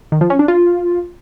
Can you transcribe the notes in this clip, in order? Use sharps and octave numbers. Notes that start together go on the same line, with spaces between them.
D#3
F3
C#4
D4
F4